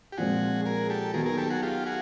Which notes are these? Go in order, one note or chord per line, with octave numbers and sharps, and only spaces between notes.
G4
A#2 F3 G#3 C4 F#4 G#4
G#4 A#4
G4 A4
D#3 F#3 B3 G#4 A#4
G#4 A#4
G4 A4
F#4 G#4
F4 G4
F#4 G#4